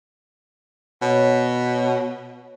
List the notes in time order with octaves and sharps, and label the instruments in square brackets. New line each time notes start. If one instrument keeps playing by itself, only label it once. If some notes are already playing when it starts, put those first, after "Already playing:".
[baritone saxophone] B2 [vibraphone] C#5